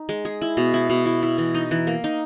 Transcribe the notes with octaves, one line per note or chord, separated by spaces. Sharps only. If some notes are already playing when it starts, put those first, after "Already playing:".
Already playing: D#4
G#3
G#4
E4
B2
E4
B2
E4
E4
E3
D#4
E3
A#3
D#4